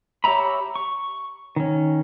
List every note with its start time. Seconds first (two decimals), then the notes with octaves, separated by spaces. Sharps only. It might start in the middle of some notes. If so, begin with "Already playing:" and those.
0.24 G4 C#5 E5 A#5 B5
0.76 C#6
1.56 D#3 C#4